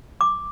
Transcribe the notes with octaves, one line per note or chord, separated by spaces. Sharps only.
D6